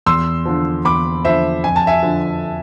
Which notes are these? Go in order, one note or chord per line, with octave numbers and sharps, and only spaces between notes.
E2 C6 E6
D3 F3
E2 B5 D6
D3 F3 C5 E5
F2 G#5
A5
E5 G#5
D3 F3